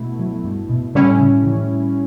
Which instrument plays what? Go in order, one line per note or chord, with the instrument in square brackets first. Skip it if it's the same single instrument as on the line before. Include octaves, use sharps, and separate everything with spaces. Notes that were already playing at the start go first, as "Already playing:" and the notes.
Already playing: [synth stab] B2 A3 E4
[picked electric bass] F#3
G2
B2
[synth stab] A2 G3 C#4 E4 [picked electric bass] C#3
[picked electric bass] C#3
E3